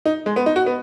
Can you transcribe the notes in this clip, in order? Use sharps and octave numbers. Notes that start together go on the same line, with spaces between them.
D#4
G#3
B3
D#4
F#4
B3